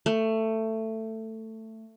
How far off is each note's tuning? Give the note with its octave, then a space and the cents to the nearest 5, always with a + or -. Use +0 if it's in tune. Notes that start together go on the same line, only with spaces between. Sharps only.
A3 +15